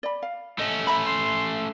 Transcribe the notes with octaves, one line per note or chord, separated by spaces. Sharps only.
D5 B5
F5
A3 C#4 D#5
E5 A#5 B5
C6